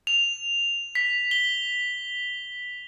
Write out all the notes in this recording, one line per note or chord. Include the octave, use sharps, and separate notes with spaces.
F7
B6
G7